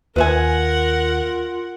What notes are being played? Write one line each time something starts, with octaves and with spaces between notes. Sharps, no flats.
D#2 F4 A#4 B4 E5 F#5 G#5